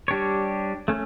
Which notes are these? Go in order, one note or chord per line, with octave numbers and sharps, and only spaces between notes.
G3 D4 G4 C#5
A3 C#4